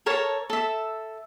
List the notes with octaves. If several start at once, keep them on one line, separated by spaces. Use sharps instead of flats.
A4 A#4 C#5 A5
A4 E5